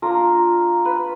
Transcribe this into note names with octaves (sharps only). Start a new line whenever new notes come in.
A#3 D4 F4 A#4 A#5
B4 B5